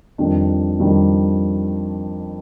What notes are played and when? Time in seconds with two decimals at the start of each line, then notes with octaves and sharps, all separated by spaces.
0.18 F2 D#3 G3 D4
0.79 F2 D#3 G3 D4